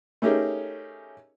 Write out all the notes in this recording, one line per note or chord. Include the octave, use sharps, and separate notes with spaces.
A3 C#4 D#4 G4 G#4 A#4